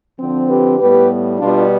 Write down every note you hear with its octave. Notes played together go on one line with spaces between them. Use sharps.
D3 F3 C4
G4 B4
A2 G3 B3 G4 B4
B2 G3 B3 D4 F4